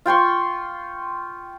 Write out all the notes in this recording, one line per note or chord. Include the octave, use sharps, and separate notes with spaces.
F4 G5 C6 C#6